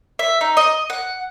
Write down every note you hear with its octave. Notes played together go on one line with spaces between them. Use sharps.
E5
D#4
D#5
F#5